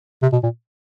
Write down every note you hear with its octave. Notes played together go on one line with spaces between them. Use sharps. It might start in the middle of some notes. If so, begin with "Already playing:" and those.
C3
B2
A#2